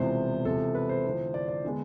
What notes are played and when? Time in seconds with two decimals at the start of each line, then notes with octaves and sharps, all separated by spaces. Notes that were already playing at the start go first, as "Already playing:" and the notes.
Already playing: E1 E2 C3 F3 B3 C5
0.45 E2 C3 F3 A4
0.75 B4
0.89 C5
1.05 E2 D3 F3
1.34 D5
1.49 D5
1.65 D3 G#3 B3